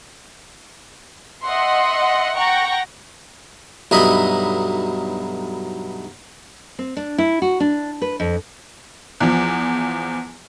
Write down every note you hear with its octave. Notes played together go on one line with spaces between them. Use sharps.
D#5 E5 F#5 C6
F#5 G5 A#5 C#6 A#6
B1 G2 D#4 D#5 E5 B5
C4
D4
E4
F#4
D4
B4
F2
E2 F3